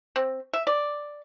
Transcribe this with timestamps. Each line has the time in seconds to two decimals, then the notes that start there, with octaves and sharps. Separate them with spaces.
0.16 C4
0.53 E5
0.67 D5